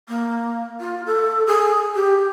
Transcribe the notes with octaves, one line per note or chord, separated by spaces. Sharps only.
A#3
F4
A4
G#4
G4